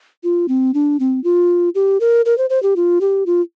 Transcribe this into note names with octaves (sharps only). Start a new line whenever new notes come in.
F4
C4
D4
C4
F4
G4
A#4
A#4
C5
C5
G4
F4
G4
F4